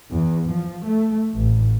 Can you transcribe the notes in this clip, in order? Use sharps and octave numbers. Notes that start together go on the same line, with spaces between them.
E2
F3
A3
A1